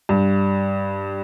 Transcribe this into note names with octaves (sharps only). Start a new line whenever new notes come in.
G2